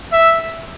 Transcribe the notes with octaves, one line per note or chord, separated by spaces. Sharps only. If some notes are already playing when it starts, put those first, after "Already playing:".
E5